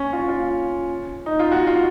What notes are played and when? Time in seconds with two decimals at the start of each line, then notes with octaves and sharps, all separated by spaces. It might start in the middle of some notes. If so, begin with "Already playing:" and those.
Already playing: C#4
0.13 F4
0.29 F4
1.26 D#4
1.39 F4
1.52 F#4
1.67 F4